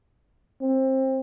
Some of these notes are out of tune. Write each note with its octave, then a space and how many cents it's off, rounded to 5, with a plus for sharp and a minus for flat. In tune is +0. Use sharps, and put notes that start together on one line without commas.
C4 +20